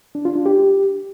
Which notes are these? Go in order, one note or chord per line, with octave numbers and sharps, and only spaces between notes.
D4
F4
D4
G4